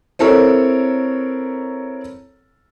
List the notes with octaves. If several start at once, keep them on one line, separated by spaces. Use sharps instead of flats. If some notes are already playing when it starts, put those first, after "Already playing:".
C4 E4 A4 A#4 C#5